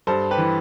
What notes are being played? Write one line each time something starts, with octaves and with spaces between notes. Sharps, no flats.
G2 A4 C5
G4 B4
E3